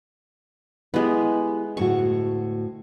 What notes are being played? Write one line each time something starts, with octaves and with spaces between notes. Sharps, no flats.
G#3 B3 E4 G4
D2 A2 F#4 C#6